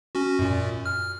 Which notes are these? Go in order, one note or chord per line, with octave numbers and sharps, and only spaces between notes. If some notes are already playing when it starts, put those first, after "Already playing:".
C#4 F#4
F#2 A#2
F6